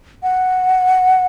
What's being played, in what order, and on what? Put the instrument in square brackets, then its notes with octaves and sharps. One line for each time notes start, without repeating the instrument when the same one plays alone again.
[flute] F#5